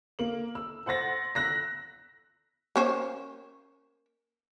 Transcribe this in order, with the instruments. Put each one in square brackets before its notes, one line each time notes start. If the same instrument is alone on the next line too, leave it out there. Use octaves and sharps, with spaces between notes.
[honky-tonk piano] A#3 F#7
E6
C5 F#5 C6 A6 A#6
E6 F#6 A#6 B6
[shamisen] A#3 C#4 C5